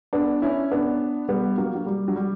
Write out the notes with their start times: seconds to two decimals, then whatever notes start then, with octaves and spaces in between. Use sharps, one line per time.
0.13 B3 D4
0.42 C#4 E4
0.71 B3 D4
1.29 G3 B3
1.57 F#3 A#3
1.75 F#3
1.86 G3
2.08 F#3
2.16 G3